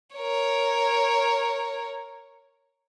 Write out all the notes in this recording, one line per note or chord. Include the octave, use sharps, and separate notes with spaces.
A#4 C#5